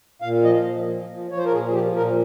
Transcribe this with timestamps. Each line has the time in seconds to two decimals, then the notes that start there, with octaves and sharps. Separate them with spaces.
0.22 A#2 F5
0.44 F3 D#5
0.66 A#2
0.87 F3
1.09 F3
1.31 F3 C#5
1.37 C5
1.45 A#4
1.52 A#2 G#4
1.68 G#4
1.73 F3 G4
1.96 A#2 A#4